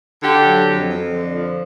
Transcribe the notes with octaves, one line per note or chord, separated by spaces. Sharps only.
D3 G4
F#3
F2
F2
D3
F3